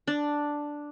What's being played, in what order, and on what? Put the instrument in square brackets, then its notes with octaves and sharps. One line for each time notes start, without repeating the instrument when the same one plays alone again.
[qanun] D4